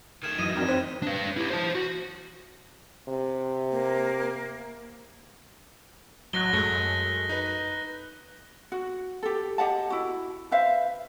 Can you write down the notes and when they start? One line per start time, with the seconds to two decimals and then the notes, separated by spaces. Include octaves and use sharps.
0.23 D#3 A3 F6 G#6 E7
0.38 F#2 E3 D#5 D#6 D#7
0.56 F2 F#3 D4 A#4
0.68 C4 B4
1.03 D4 B4
1.37 E4 G4
1.50 C5 A5
1.75 F#4
3.08 C3
3.71 A#3
6.33 A1 F#3 F#6 A#6 G7
6.53 F#2 G#3 A3
7.29 D#4 B4
8.72 F#4
9.23 G4 A4
9.58 G4 D#5 F#5 A5
9.90 E4 F#4
10.51 B4 C5 E5 F5